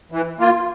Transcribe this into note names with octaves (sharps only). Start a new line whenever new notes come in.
E3
A#3 F4